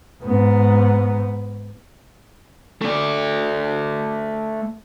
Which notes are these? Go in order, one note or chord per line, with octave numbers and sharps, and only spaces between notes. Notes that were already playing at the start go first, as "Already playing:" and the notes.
G#2 B3
A3 D5